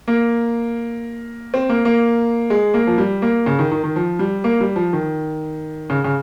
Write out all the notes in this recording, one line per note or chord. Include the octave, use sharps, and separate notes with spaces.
A#3
C4
A#3
A#3
G#3
A#3
F3
G3
A#3
C#3
D#3
D#3
D#3
F3
G3
A#3
G3
F3
D#3
C#3
C#3